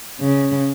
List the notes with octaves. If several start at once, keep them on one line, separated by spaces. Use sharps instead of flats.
C#3